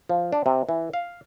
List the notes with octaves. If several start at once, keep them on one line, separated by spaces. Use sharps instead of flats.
F3
D4
C3
E3
F5